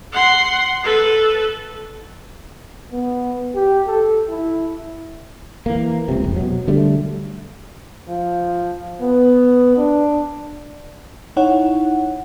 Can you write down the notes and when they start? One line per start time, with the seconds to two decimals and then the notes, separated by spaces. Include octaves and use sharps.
0.12 F#5 C6
0.84 A4 B4
2.92 B3
3.55 G4
3.87 A4
4.29 E4
5.66 E3 A#3
6.08 C#2 C3
6.24 F1
6.36 B2 F#3
6.67 D3 G3 A3
8.08 F3
9.01 B3
9.77 D4
11.37 D#4 E4 C#5 F#5